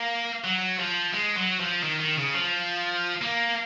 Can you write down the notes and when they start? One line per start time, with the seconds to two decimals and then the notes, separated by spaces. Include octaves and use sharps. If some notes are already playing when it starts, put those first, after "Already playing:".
Already playing: A#3
0.44 F#3
0.80 F3
1.14 G#3
1.36 F#3
1.60 F3
1.83 D#3
2.00 D#3
2.17 C#3
2.34 F3
3.22 A#3